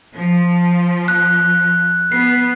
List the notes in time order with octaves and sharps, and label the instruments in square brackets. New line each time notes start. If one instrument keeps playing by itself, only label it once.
[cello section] F3
[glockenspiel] F#6
[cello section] B3 [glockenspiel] C7